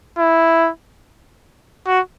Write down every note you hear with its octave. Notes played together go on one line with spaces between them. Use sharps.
E4
F#4